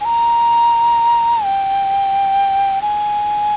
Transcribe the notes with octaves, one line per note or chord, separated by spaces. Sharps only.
G#5
A#5
G5
G#5